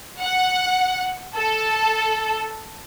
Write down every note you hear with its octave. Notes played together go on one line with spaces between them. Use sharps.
F#5
A4